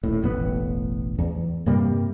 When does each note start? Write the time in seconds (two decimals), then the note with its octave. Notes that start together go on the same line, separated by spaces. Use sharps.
0.03 D#1 A2
0.22 E1 A1 B3
1.18 E2
1.66 G2 C3 G3 A#3